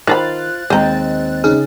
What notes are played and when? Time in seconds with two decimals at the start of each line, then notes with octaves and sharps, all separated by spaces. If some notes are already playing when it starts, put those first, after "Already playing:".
0.07 D#3 F4 C5 A#5 B5 F#6 A6
0.70 D#2 G#3 C4 C5 D#5 G5 A#5
1.44 C#3 C#4 D#4 G#4